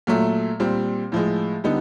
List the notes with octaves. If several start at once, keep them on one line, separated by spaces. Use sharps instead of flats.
A#2 F#3 A3
A#2 G3 C4
A2 F3 G#3
D3 G3 B3 D#4